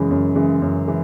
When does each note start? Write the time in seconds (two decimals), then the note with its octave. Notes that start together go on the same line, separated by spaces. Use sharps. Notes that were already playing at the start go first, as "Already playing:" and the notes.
Already playing: F#2 C#3 E3 G#3
0.11 F#2
0.35 C#3 E3 G#3
0.62 F#2
0.87 E3 G#3